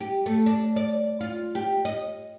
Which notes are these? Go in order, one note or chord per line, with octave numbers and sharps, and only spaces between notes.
G4
A3
D4
D5
F4
G4
D#5